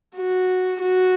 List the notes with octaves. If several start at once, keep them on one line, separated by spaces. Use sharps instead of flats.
F#4
F#4